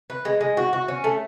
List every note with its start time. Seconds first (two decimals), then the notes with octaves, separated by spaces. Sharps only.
0.10 B4
0.25 G#3
0.41 G#3
0.57 F#4
0.73 F#4
0.88 C#4
1.04 A3